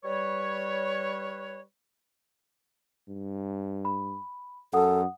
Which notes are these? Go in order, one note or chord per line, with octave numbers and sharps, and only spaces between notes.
G3 B4 C#5
G2
B5
F#2 A4 F#5 D#6